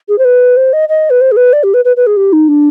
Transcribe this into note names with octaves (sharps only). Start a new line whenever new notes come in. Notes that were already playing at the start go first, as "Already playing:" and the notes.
G#4
C5
B4
C5
D#5
D#5
B4
C5
G#4
B4
D5
G4
B4
B4
B4
G#4
G4
D#4
D4